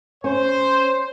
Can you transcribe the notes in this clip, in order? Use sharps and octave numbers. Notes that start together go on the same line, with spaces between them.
C#4 C5